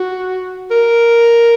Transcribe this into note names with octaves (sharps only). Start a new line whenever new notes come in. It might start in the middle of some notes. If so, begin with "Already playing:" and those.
Already playing: F#4
A#4